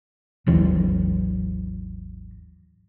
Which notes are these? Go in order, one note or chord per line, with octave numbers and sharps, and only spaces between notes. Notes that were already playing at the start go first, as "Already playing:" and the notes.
G#1 D#2 E3 F#3